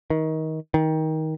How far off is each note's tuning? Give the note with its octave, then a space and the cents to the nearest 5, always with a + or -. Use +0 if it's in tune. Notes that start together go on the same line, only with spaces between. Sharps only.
D#3 +25
D#3 +20